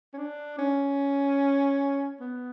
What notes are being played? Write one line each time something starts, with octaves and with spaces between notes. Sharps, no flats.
C#4
D4
C#4
B3